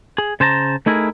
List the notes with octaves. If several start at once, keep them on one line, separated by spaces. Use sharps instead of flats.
G#4
C#3 C5 A5 A#5
A3 D#4 E4 G#4 A#4